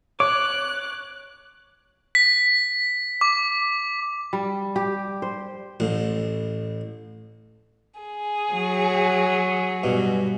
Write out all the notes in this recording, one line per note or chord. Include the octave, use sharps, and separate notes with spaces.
C#5 D6 F#6
B6
D6
G3
G4
C5
A1 A2
G#4
F#3
G2 B2